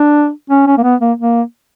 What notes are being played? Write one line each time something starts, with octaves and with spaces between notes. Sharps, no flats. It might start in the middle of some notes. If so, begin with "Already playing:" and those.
Already playing: D4
C#4
C#4
A#3
B3
A#3
A#3